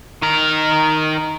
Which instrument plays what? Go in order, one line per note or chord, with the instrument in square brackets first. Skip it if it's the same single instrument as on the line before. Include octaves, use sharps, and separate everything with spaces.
[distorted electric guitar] D#3 A#4